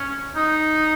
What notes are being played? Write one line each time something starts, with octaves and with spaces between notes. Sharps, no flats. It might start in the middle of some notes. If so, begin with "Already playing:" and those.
Already playing: C#4
D#4